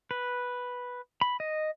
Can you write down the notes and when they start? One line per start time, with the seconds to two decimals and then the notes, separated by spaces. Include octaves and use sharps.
0.11 B4
1.21 B5
1.40 D#5